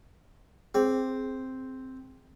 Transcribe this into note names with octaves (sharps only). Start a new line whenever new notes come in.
C4 G#4